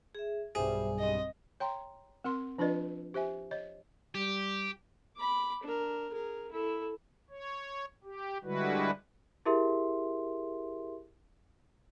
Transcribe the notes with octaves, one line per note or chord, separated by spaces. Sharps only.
G#4 E5
B1 G2 G3 G#4 C5 E5 G#5
C4 D#5 D#6
C#5 G5 A#5 C6
C4 A#4 F#5 C6
F3 D4 F4 B4 D5 D#5
G4 C5 E5 G#5
C#5 D#5
G3 G4
B5 D6
D4 A#4
G#4 A#4
E4 A4
C#5
G4
D3 G3 G#3 E4 F#4 B4
E4 G4 G#4 A#4 E5 C6